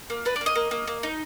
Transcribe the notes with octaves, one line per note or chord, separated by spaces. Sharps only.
A#3
D4 B4
D5
A#3
D#5
A#3
A#3
A#3
D#4